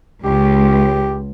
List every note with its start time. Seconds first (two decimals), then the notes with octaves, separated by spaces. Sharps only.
0.24 C#2 G4